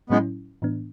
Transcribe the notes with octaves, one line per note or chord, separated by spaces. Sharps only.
A2 F#3 G#3 B3 C#4 E4
A2 E3 B3 D4